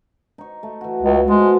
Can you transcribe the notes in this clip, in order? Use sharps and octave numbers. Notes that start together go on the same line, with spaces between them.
D#4 C#6
A3
E3 F#4
C#2
B2 G#3 A4 C5